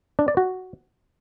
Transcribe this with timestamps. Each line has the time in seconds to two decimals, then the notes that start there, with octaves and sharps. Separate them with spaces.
0.19 D4
0.28 D5
0.37 F#4